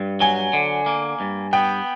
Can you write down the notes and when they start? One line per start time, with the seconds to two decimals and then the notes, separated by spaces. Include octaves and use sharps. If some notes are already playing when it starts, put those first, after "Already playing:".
Already playing: G2
0.20 F#3 G#5
0.53 D3
0.86 A#3
1.20 G2
1.53 B3 G5